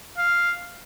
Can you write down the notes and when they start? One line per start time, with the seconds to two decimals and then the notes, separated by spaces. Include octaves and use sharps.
0.18 F5